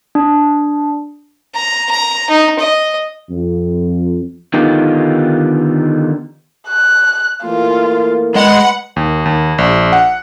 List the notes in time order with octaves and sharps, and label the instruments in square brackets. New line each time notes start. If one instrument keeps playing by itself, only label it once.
[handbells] D4
[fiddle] A#5
A#5
D#4
D#5
[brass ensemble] F2
[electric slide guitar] D3 D#3 B3 D#4 F4 G4
[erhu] F#6
[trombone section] E3 A3 A#3 [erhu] F4
[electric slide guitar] G#3 D#5 [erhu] B4 [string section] F#5
[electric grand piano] D#2
D#2
A#1
F#5